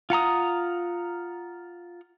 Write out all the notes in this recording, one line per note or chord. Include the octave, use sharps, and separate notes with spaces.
F4 F#5 A#5 D#6